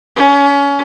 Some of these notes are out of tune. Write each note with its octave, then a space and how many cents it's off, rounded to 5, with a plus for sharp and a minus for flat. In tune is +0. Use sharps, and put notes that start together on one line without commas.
C#4 +25